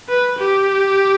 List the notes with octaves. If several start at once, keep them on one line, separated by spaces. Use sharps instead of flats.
B4
G4